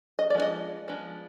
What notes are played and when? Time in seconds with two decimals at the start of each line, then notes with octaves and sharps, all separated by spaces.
0.19 D#5
0.30 D5
0.34 F3 G#3 B3 D4
0.42 D#5
0.88 F3 G#3 B3 D4